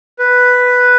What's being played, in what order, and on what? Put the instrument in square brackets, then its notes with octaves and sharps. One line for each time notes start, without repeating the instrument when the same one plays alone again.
[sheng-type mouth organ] B4